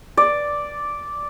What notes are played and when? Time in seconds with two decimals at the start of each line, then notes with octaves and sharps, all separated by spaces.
0.17 D5